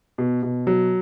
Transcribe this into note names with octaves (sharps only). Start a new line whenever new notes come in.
B2
B2
F#3